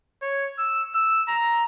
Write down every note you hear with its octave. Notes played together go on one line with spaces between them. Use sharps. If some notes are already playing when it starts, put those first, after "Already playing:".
C#5
E6
E6
A#5